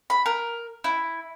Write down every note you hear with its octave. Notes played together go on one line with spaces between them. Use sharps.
B5
A#4
E4